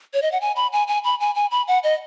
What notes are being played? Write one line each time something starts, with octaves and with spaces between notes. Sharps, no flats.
C#5
D#5
F#5
G#5
B5
G#5
G#5
B5
G#5
G#5
B5
F#5
D#5